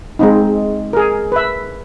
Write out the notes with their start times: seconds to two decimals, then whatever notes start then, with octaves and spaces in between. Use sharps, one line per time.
0.19 G#3 C4 D#4
0.93 G#4 A#4
1.32 B4 E5